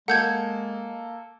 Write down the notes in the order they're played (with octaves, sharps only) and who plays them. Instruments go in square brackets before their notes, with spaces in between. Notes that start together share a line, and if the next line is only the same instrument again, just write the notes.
[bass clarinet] G#3 [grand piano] A#3 A4 [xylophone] F#5 G6 G#6